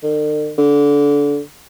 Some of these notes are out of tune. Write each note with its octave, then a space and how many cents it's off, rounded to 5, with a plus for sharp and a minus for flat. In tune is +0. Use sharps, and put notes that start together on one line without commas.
D3 +45
D3 -25